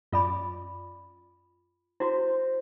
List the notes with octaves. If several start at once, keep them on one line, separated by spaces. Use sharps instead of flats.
F#2 F4 D5 B5
E4 F#4 C5